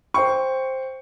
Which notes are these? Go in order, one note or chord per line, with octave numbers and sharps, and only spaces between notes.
C5 G5 C#6